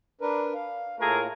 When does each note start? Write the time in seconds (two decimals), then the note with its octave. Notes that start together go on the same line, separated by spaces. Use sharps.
0.21 D4 A#4 B4
0.54 F5
1.00 A2 A3 A#3 F4 G#4 A#4